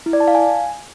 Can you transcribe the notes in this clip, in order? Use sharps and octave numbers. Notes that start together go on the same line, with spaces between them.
E4
D5
A5
F5
G#5